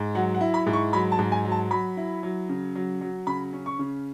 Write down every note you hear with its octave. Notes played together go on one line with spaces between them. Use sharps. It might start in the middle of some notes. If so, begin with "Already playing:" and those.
Already playing: G#2
F#3 F#5
F#5
E4
B5
G#2
C#6
F#3 B5
A5
G#2
G#5
F#3
A5
F#3 B5
E4
F#3
C#3
F#3
F#3
C#3 B5
C#4
C#6
C#3